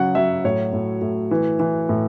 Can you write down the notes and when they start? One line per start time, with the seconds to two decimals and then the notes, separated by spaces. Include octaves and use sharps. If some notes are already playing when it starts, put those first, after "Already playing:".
Already playing: C#3 F#3 F#5
0.15 F#3 E5
0.44 A2 C#5
0.73 A2
1.02 A2
1.31 E3
1.60 E3
1.89 A2